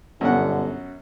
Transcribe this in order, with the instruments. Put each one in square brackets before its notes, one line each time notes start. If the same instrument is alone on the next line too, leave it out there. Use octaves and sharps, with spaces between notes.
[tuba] G1 [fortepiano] F#2 B2 F#5 [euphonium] D3